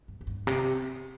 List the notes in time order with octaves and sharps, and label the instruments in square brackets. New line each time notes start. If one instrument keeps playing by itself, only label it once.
[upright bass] G2
F2
G2
C3